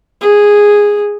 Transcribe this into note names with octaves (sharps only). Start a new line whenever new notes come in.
G#4